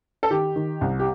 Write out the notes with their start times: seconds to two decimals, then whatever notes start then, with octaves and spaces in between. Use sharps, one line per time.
0.23 A4
0.31 D#3 G4
0.56 D#3
0.81 C2
0.99 G4